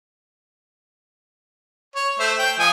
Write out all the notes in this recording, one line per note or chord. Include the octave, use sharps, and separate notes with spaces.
C#5
A3 C5 E5
G5
F3 D#5 G#5